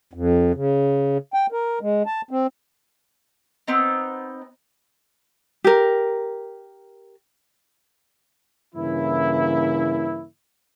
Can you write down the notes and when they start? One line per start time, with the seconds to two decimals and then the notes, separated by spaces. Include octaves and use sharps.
0.14 F2
0.55 C#3
1.34 G5
1.52 A#4
1.81 G#3
2.06 A5
2.31 C4
3.68 B3 C4 D#4
5.64 G4 A#4
8.75 G2 C#3 E3 A#3 C#4 E4